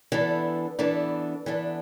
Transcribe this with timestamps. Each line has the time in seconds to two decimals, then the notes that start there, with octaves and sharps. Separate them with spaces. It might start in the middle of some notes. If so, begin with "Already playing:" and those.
0.12 E3 B3 D4 A4
0.79 E3 B3 D4 A4
1.46 E3 B3 D4 A4